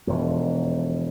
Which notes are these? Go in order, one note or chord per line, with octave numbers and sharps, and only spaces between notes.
E1 F2